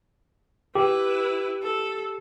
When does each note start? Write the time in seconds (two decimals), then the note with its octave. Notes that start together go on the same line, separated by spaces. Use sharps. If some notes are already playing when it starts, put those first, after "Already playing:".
0.75 E4 G4 B4
1.62 A4